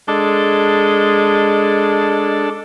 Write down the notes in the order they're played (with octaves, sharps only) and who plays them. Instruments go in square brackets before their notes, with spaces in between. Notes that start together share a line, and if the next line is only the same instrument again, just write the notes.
[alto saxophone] G#3 [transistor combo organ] D4 A4